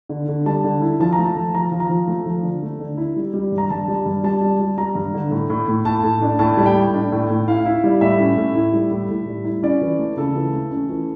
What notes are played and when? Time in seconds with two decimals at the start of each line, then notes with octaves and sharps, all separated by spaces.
0.09 D3
0.28 D3
0.46 G3 A5
0.64 D3
0.82 E4
1.00 F3 A5
1.13 A#5
1.18 A3
1.25 A5
1.36 F3
1.54 F3 A#5
1.72 F3
1.80 A#5
1.90 F3
2.08 A3
2.26 F3
2.43 D3
2.62 A3
2.79 D3
2.97 E4
3.16 G3
3.34 G3
3.52 G2
3.58 A#5
3.70 G2 A5
3.88 G3
4.06 G2
4.23 G3 A5
4.41 G3
4.60 G3
4.78 G3 A#5
4.95 G2
5.14 D3
5.31 A2
5.50 A2
5.68 A2
5.85 A2 A5
6.03 A2
6.22 D4
6.39 A2 A5
6.57 G3
6.66 G5
6.76 A2
6.94 D4
7.12 A2
7.30 A2
7.48 E4 F5
7.66 E4
7.84 G3
8.01 A2 E5
8.20 C#4
8.37 A2
8.55 E4
8.73 G3
8.91 A2
9.09 A2
9.27 G3
9.45 E4
9.63 C#4 D5
9.81 E3
9.99 A3
10.17 C#3 A4
10.35 E3
10.53 A3
10.71 C#4
10.89 E3